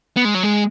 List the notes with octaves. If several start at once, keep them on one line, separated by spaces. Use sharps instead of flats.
B3
G#3
F#3
G#3